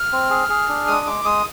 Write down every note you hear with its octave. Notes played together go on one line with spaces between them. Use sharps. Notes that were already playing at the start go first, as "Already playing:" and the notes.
Already playing: F6
C4
G#4
G#4
D4
G#3 D#6
G#3 D6
G#3 D#6